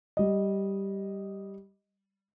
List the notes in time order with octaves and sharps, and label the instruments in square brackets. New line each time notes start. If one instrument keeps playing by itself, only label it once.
[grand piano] G3 D#5